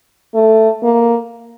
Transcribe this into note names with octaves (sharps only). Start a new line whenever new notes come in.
A3
A#3